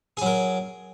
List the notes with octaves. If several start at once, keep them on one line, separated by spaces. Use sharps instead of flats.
F#3 G#4 A#4